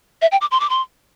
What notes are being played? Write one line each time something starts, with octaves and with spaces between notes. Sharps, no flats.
E5
G5
D6
C6
D6
C6